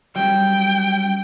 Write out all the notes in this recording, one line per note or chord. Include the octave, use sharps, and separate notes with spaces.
F#3 G3 C#4 G5